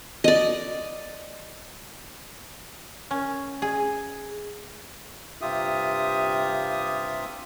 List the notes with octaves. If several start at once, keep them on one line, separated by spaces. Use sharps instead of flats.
D5 D#5
C#4
G#4
G2 C3 F4 G4 E5 D#6